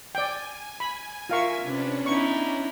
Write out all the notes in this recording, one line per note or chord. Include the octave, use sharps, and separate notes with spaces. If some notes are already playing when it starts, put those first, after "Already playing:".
D5 G5 G#5
B5
F4 A#4 E5 F5 C#6
C3 C#4 D4 B4
B3 D#4 E4 C#6